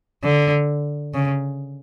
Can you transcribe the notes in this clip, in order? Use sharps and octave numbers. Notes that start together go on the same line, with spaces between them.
D3
C#3